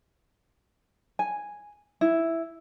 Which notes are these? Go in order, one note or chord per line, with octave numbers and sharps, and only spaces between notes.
G#5
E4